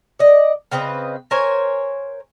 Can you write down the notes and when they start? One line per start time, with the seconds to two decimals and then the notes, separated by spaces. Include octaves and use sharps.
0.19 D5 D#5
0.72 C#3 C4 B4 D#5
1.31 A#4 C5 C#5 G#5